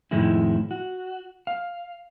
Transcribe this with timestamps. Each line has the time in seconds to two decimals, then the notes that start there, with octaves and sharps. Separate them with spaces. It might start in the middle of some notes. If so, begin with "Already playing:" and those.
0.11 F2 A2 D#3 G#3 E4
0.71 F#4
1.47 F5